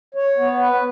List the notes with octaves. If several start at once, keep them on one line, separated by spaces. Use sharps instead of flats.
C#5
B3
B4